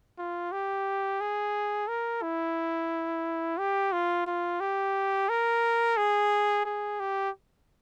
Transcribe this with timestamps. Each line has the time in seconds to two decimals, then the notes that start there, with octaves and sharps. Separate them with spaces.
0.19 F4
0.52 G4
1.21 G#4
1.88 A#4
2.23 E4
3.59 G4
3.93 F4
4.27 F4
4.61 G4
5.29 A#4
5.97 G#4
6.66 G#4
7.00 G4